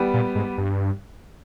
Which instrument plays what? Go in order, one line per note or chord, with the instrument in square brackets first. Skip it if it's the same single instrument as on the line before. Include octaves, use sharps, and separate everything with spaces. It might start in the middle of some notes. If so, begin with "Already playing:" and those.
Already playing: [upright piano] G3 B3 G4
[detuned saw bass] A#2
G#2
G2